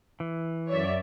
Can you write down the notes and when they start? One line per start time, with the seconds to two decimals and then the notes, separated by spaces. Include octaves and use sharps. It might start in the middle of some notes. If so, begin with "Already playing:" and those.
0.20 E3
0.68 F#2 C#5 D5 E5